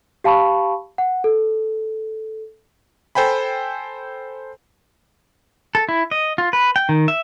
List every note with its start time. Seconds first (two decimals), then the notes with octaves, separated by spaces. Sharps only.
0.24 G4 F5 A5 B5 C#6
0.98 F#5
1.24 A4
3.15 A4 C5 G5 G#5 B5
5.75 A4
5.89 E4
6.11 D#5
6.38 F4
6.53 B4
6.76 G5
6.89 D#3
7.08 E5